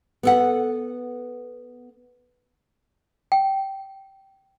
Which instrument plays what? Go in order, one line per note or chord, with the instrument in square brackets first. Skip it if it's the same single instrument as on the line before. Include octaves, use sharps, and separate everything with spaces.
[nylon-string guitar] B3 A4 F#5
[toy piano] G5